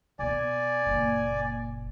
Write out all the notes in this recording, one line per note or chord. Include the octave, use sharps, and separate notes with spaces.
B2 B3 D5 G#5
F#1 A#2